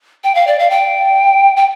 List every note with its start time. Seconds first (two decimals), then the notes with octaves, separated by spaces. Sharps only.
0.24 G5
0.35 F5
0.47 D5
0.59 F5
0.70 G5
1.56 G5